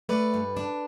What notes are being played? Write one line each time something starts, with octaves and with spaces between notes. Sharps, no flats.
A3 B4 D5
G2
D4